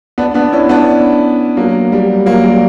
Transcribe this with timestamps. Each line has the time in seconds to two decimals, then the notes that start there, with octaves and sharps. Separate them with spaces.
0.18 B3 D4
0.34 B3 D4
0.52 C#4 E4
0.69 B3 D4
1.57 F#3 A#3
1.92 G3
2.26 F#3 A#3
2.43 G3